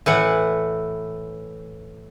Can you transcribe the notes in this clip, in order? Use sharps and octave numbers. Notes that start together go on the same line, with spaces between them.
A2 E3 F#5